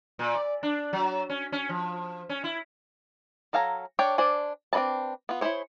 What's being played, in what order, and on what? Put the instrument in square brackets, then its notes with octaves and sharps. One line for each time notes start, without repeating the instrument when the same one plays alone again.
[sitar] A#2
D5
D4
F#3
C#4
C#4
F3
C#4
E4
[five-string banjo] F#3 A4 F5 G#5 A#5
D4 C#5 G5
D4 C5 D5 G#5
C4 D4 D#4 B4 A5
B3 F4
E4 F4 G#4 C5 C#5